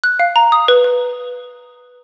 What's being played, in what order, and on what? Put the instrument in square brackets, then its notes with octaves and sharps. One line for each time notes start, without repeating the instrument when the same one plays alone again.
[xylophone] F#6
F5
A#5
D#6
B4
B4